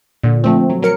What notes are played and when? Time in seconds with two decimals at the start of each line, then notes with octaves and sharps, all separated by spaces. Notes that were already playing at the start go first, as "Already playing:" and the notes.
0.23 A#2 D3
0.44 F3 A3 C4
0.70 F#3
0.83 F#3 A#4 C#7